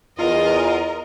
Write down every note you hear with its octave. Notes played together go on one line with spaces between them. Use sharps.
E2 F4 A#4 D#5